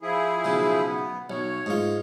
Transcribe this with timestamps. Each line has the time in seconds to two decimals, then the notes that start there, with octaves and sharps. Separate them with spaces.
0.02 F3 E4 G#4
0.45 B1 C#3
0.85 B3
1.30 B1 C#5
1.66 G#2 F4